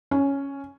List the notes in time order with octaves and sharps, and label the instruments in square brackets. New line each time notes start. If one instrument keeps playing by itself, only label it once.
[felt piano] C#4